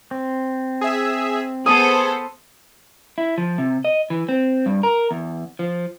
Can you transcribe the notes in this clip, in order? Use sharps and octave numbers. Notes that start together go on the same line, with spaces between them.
C4
G#4 E5
B3 G#4 A4 C5 D#6
E4
F3
C3
D#5
E3
C4
G2
A#4
E2
F3